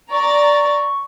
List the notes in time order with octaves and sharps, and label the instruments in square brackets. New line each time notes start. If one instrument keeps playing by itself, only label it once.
[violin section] D5 A#5 A6 [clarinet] C#6